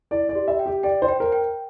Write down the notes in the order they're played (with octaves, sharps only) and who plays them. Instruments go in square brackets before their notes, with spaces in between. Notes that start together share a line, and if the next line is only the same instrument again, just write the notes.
[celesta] E4 [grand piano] D5
[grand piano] D5
[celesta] G4
[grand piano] E5
[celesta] G5
[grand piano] G4
[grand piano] D5 [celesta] G5
[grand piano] C5
[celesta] G5
[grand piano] A#4
[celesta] G5